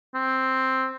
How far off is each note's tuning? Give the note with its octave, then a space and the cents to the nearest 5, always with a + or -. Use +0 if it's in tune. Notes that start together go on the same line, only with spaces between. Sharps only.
C4 +5